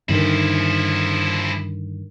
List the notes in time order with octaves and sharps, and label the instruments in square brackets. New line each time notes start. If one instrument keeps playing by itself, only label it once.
[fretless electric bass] G2 D3 D#3 [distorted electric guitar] F3 E4